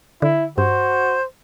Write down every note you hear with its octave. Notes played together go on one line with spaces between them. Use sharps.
D3 E4
G2 F#4 C5